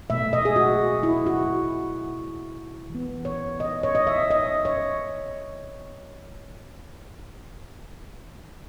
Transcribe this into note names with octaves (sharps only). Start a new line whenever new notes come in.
B2 A3 E5
D#5
G#4
F#4
E4
F#4
E3 B3
C#5
D#5
C#5
D#5
E5
D#5
C#5